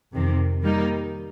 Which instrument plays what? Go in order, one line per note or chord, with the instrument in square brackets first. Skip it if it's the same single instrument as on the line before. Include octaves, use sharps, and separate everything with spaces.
[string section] F2 C3 D#3
D#3 G3 A#3 D#4